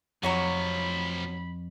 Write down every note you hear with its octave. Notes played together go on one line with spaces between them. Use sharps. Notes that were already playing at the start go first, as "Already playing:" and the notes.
F2 C3 F3 F#3 C#5 A#5 B5